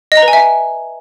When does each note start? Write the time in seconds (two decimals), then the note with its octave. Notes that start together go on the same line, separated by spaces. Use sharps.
0.12 D#5
0.17 A#5
0.22 B4
0.28 G#5
0.33 E5